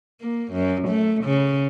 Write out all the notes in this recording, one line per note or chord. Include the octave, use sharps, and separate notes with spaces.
A#3
F#2
A3
C#3